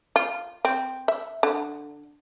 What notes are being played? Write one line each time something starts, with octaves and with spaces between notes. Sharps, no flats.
F4
C4
E5
D3